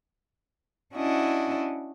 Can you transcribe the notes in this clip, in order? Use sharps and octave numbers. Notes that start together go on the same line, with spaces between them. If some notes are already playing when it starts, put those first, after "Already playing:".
C#4 D4 E4 F#4 D#5